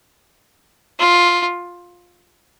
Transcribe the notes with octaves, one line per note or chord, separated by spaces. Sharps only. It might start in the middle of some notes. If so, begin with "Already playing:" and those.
F4